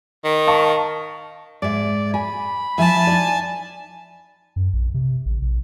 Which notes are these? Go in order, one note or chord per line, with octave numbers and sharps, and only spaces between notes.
D#3
F5 A5 C#6
G#2 D5 E5
G#5 B5
F3 E4 E5 G#5 A5
D#4 D5
F#2
A#1
C3
A1
A#1